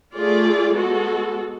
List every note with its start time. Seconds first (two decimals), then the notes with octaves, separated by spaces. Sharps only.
0.15 A3 F4 G#4 D5
0.74 G#3 B3 F#4 A4